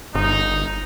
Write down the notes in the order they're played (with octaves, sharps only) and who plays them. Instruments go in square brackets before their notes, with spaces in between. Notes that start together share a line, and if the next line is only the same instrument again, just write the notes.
[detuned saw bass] G1 [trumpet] D#4